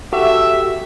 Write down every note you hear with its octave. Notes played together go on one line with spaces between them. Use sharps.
F#4 G4 A4 E5